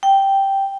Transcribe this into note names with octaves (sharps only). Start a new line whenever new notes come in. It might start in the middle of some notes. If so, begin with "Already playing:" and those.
G5